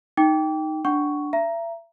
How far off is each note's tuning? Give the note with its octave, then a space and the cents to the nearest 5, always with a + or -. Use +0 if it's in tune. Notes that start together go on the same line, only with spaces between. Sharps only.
D#4 +0 G5 +0 D6 -30
D4 +0 F#5 +20 C#6 +5
E5 +35 A#5 +0